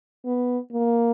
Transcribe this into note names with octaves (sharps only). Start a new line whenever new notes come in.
B3
A#3